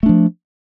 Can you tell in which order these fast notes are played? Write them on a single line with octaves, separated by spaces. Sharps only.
A3 D4 F3